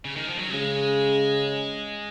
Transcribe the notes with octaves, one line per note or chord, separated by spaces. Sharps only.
C#3
D#3
F3
F#3
C#3 G#3